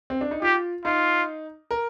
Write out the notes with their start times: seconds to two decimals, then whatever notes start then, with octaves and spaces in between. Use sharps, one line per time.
0.10 C4
0.21 D4
0.31 D#4
0.42 F4 G4
0.85 D#4 F4
1.71 A#4